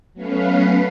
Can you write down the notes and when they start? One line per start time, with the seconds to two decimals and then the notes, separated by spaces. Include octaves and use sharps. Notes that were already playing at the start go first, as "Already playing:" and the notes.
0.13 F#3 A3 B3 C#4 B4 F5